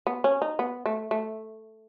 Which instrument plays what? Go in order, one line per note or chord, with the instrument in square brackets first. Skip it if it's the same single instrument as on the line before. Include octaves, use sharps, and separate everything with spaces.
[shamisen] B3
C#4
D#4
B3
A3
A3